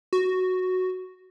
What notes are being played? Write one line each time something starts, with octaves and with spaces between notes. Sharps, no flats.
F#4